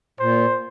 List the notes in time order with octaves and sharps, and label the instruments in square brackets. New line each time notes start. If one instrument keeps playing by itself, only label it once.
[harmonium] A#2 [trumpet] C5